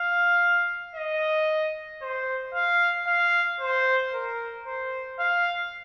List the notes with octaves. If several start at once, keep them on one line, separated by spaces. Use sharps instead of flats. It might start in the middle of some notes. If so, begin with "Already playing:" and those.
Already playing: F5
D#5
C5
F5
F5
C5
A#4
C5
F5